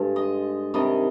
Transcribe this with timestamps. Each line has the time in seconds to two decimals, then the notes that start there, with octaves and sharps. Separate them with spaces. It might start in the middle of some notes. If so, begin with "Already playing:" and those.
Already playing: G2 D3 G#3
0.16 D#5
0.74 C3 D#3 G3 D4 D#5